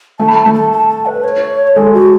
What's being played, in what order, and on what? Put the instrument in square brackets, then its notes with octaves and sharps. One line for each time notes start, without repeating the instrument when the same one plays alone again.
[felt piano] A3 [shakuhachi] A5
[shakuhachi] B5
A5
[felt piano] A3
[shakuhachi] A5
A5
A5
B4
C#5
[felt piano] G#3 [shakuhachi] A4
[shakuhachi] F#4